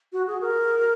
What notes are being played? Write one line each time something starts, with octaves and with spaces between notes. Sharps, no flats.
F#4
G#4
A#4